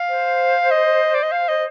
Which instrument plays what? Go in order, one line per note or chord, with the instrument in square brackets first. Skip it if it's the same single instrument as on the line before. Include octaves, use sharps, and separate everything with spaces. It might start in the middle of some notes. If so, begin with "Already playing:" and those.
Already playing: [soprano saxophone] F5
[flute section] C5
[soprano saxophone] D#5
D5
D#5
F5
D#5